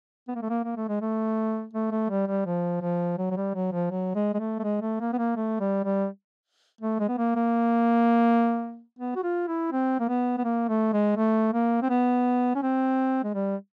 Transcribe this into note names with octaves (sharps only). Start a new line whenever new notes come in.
B3
A#3
A3
A#3
A#3
A3
G#3
A3
A3
A3
G3
G3
F3
F3
F#3
F#3
G3
F#3
F3
F#3
G#3
G#3
A3
A3
G#3
A3
A#3
B3
A#3
A3
G3
G3
A3
G#3
B3
A#3
A#3
B3
F#4
F4
E4
C4
A#3
B3
B3
A#3
A3
G#3
A3
A#3
C4
B3
C#4
C4
G#3
G3